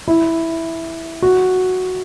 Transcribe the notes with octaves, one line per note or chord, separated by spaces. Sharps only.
E4
F#4